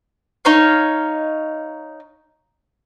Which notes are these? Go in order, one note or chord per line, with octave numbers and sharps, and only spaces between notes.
D#4 C#5 F5